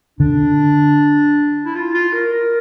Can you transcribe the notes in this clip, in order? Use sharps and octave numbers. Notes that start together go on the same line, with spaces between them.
D3 D4
E4
F4
F4
A#4
A#4